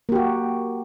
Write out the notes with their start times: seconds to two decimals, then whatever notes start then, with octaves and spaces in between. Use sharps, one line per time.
0.09 A#3
0.12 G4
0.15 F#4